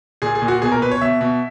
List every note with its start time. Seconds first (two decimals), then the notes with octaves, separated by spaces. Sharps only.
0.22 A#2 G#4
0.35 G#4
0.42 A#2
0.48 F#4
0.62 B2 G#4
0.72 A#4
0.82 B2 B4
0.91 C#5
1.01 B2 E5
1.21 B2